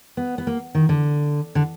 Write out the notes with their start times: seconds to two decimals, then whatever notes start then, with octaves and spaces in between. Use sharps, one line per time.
0.17 B3
0.38 B3
0.47 A#3
0.75 D#3
0.89 D3
1.55 D3